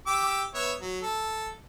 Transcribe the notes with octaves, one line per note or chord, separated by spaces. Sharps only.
G4 D6 E6
B3 C#5 E5
F#3
A4